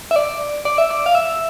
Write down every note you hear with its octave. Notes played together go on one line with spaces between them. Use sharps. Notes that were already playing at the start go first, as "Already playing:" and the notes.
E5
D5
D5
E5
D5
F5
E5